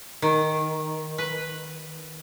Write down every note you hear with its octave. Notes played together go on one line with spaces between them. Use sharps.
D#3
B4